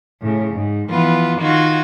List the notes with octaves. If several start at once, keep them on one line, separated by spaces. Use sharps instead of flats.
A2 C#3
G#2
E3 F3 B3 F4
D#3 F4 F#4 G#6